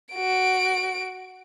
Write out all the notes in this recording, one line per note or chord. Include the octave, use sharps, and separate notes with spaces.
F#4 D7